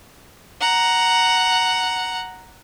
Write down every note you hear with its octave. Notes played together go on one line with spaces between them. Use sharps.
F#5 A#5